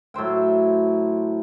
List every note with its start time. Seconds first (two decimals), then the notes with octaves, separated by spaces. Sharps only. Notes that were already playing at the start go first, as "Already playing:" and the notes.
0.14 A2 F#3 C5 G5